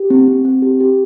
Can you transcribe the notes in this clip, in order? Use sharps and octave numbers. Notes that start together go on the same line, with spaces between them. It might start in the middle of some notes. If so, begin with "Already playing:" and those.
Already playing: G4
C4
C4
C4
G4
G4